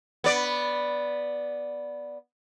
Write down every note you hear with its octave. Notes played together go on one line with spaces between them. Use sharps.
B3 D5